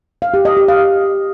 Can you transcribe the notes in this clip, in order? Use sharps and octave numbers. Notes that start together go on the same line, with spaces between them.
F5
G4
D#5
G4
F5